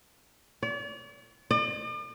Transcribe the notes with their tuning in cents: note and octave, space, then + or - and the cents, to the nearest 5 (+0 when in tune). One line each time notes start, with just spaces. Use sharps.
D5 -40
D5 +45